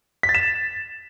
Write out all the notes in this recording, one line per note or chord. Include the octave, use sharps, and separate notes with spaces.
B6
A6
E7